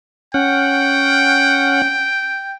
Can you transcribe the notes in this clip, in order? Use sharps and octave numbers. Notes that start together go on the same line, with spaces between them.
C#4 F#5 G5